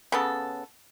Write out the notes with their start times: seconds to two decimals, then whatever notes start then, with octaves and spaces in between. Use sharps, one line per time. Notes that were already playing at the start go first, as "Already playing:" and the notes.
0.12 C#3 B3 A4